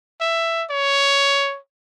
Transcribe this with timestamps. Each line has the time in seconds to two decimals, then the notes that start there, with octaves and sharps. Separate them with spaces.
0.21 E5
0.70 C#5